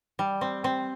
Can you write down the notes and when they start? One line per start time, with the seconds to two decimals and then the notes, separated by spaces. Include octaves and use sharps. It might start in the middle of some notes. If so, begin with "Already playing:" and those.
0.19 G3
0.41 C4
0.64 C4